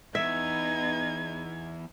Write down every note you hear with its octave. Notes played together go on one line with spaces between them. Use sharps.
E2 B3 D#4 E5 G#6